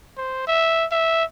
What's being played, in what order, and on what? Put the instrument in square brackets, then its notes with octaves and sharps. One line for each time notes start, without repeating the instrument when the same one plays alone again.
[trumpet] C5
E5
E5